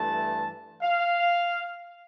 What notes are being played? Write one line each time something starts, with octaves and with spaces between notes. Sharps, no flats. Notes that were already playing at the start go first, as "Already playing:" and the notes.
Already playing: G2 E3 A3 A5
F5